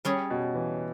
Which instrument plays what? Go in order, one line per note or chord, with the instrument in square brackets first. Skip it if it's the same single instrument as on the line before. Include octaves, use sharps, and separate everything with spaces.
[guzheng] G3 C#4 G#4 C#5
[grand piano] B2
E3